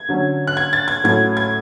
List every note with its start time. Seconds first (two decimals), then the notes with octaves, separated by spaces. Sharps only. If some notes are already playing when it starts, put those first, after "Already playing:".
Already playing: G#6
0.09 D3 F#3 C#4
0.47 F#6
0.57 G#6
0.73 A6
0.88 G#6
1.04 A2 F#3 A3 C#4 G#6
1.37 G#6